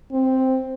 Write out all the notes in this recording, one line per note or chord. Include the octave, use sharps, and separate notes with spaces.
C4